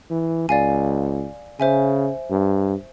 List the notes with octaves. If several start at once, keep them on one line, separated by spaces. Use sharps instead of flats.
E3
C#2 D5 F5 G#5
C#3 C5 E5 G#5
G2